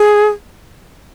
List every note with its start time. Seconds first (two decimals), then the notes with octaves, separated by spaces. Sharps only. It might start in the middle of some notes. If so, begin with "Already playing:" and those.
Already playing: G#4